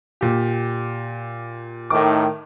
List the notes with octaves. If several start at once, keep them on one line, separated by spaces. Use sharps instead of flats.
A#2 G4
A2 D#3 D6